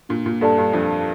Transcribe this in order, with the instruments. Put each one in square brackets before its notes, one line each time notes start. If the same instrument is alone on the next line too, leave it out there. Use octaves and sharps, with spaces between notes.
[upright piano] A#2 [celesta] D4
[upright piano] A#2
[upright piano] G2 [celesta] A4 D5 A5
[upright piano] G2
[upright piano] F2 [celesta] D4